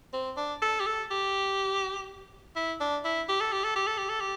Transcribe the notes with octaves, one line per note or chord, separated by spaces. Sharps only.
C4
D4
A4
G4
A4
G4
E4
D4
E4
G4
A4
G4
A4
G4
A4
G4
A4
G4